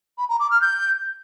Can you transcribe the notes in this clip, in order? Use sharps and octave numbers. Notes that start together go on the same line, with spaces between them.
B5
A#5
D6
F6
G6